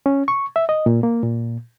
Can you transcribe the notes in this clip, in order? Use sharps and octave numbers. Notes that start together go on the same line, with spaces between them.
C#4
C#6
E5
D#5
A#2
A#3
A#2